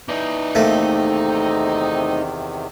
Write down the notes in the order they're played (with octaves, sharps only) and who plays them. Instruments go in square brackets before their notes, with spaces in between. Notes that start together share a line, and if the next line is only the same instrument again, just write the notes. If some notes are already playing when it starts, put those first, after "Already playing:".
[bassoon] E3 [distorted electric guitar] D#4 D5
[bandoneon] E2 C3 D#3 [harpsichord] A3 A#3 [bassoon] C4